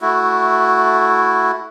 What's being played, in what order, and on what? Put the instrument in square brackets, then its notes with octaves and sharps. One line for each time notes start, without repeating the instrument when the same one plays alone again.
[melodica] A3 E4 F#4